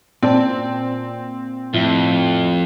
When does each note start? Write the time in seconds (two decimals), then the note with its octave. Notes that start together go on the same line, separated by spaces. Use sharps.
0.22 A#2 C4 D5 A5
1.74 F2 A2